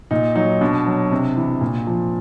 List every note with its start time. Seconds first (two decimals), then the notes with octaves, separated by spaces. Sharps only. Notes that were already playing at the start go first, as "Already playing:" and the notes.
0.11 A#2 D#4
0.35 F#3 D#4
0.61 B2 D4
0.86 F#3
1.12 C3
1.37 E3
1.61 A#2
1.87 F3